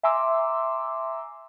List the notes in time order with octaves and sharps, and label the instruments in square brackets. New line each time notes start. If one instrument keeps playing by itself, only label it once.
[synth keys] E5 G#5 A#5 C6 D6 E6